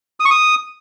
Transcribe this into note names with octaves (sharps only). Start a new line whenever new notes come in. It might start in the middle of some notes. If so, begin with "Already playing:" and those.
D#6
C#6
D#6